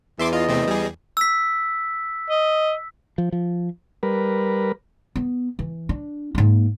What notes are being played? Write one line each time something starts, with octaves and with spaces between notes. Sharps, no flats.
E2 E5 C6 D6
F4 D#5
C3 A3 C4
G3 G#4
E6 B6
D#5
F3
F3
G3 A#4 B4
B3
E3
D4
G#2 A#3